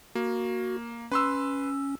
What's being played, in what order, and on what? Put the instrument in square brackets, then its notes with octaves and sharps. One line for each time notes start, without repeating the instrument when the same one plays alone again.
[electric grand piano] A#3 [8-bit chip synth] F#4
[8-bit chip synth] C#4 [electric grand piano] B4 C6 E6